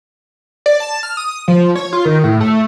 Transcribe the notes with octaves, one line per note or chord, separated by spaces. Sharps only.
D5
A5
F6
D#6
F3
C#5
F4
D#3
A2
A3